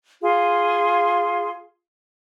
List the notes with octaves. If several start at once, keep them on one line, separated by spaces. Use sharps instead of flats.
F4 G#4 F5 C6